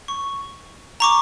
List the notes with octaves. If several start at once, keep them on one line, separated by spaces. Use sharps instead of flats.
C#6
A#5 C#6 D6